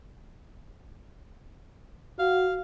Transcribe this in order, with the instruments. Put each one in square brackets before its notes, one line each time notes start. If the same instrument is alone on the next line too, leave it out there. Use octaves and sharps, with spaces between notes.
[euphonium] F#4 [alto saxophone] F5